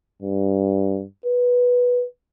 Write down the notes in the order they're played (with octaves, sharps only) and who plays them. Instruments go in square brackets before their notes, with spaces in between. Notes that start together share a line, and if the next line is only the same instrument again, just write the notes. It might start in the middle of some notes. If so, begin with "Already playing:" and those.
[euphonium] G2
B4